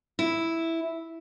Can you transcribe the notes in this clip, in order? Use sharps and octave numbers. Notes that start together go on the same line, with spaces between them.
E4